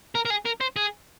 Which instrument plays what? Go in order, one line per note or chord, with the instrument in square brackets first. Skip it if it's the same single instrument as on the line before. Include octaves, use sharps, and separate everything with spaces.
[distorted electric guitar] A#4
A#4
G#4
A#4
C5
G#4